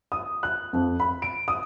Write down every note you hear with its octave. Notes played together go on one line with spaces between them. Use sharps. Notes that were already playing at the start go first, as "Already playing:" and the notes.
D#6
F#6
F2
B5
D7
D#6